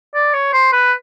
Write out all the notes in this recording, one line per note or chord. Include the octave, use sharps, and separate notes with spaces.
D5
C#5
C5
B4